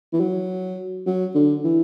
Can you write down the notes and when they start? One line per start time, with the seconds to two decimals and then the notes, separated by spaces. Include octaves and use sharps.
0.13 E3
0.21 F#3
1.07 F#3
1.35 D3
1.64 E3